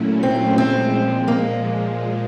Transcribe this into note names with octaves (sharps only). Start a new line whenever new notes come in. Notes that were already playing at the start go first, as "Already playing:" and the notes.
Already playing: A#2 F#3 A3 C#4 E4
C4
A#2 F3 G#3 C4
A#3